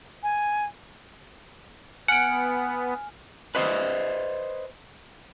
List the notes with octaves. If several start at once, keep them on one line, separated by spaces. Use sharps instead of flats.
G#5
B3 F#5 G#5 F6 C#7 D7
B4 C5 D#5